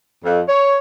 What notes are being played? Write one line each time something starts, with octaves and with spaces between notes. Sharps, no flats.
F2
C#5